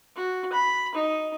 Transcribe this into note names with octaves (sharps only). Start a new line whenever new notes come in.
F#4
B5
D#4